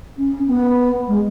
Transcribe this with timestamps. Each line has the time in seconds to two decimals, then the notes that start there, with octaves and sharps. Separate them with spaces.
0.18 C#4
0.48 B3
1.08 G#3